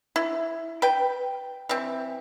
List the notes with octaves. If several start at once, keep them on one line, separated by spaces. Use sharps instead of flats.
E4
B4 G5
E3 C4